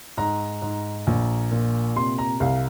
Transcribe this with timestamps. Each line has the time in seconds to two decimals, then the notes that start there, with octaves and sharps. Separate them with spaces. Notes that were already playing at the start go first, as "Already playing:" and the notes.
0.17 G#2 A#5
0.62 G#2
1.07 A#1
1.51 A#2
1.96 C3 C6
2.18 A#5
2.40 C2 F5